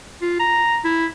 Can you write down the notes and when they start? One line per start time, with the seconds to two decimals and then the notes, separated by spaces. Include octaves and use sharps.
0.22 F4
0.39 A#5
0.85 E4